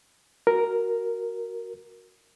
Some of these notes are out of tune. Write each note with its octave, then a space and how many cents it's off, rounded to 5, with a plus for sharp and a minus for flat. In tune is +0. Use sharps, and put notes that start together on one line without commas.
F#4 +0 A#4 +0